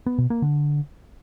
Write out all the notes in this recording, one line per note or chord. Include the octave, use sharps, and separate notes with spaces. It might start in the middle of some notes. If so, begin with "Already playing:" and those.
B3
B2
A#3
D3